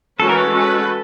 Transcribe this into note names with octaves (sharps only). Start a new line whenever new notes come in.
E3 G#3 C#4 F#4 A4 B4
A#4
A4
G#3 C#4 F#4 B4